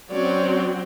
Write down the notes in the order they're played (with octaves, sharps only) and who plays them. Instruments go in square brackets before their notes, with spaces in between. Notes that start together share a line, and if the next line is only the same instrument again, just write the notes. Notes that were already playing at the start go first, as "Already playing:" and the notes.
[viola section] F#3 C4 F#4 [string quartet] C#4 C#5 D5